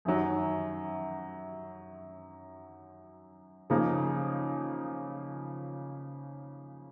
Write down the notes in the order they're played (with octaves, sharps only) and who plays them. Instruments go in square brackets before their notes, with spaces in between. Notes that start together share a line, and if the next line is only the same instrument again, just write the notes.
[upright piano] F#2 D#3 F#3
C#3 F3 A#3 D#4